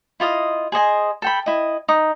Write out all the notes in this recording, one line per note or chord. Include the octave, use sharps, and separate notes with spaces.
E4 F4 D#5 D#6
G#4 C5 D#5 G#5
A4 G5 B5
E4 D#5
D#4 D#6